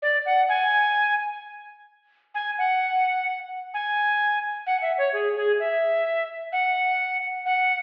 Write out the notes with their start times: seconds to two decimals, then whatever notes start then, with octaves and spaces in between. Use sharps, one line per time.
0.02 D5
0.26 F#5
0.49 G#5
2.35 G#5
2.58 F#5
3.74 G#5
4.67 F#5
4.82 E5
4.98 C#5
5.13 G#4
5.36 G#4
5.59 E5
6.52 F#5
7.46 F#5